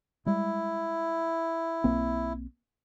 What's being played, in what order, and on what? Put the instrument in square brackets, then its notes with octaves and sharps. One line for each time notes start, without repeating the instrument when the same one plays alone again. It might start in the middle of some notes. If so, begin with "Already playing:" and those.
[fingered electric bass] G3 G#3 [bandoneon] E4
[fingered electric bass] B1 A#3 C4